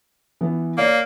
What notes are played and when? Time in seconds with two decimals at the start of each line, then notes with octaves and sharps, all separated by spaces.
0.41 E3 B3
0.78 A#3 C#5 D5 F5